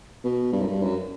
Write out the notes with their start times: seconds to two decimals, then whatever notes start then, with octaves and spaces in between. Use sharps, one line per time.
0.24 B2
0.52 G2
0.60 F#2
0.67 G2
0.82 F#2